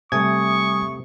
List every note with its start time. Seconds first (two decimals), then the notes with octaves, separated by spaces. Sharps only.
0.12 C3 G3 A3 G#5 C#6 D#6 G#6